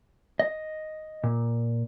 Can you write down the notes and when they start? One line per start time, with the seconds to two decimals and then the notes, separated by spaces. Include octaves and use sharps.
0.39 D#5
1.24 A#2